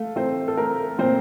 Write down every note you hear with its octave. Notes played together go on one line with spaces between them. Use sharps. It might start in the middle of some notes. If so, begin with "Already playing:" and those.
Already playing: A3 A4 F5
A3 C4 C5
A4
A3 A#4
A#2 C4 C5